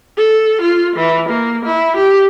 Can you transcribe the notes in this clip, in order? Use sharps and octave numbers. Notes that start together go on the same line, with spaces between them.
A4
F4
E3
A#3
E4
G4